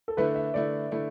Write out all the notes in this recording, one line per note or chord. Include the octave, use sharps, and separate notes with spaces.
A4
D3 A3 E4 B4
E5
D3 A3 E4 D5
D3 A3 E4